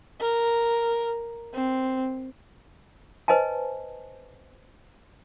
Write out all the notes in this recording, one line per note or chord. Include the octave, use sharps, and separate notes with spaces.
A#4
C4
B4 C5 D#5 G#5 A5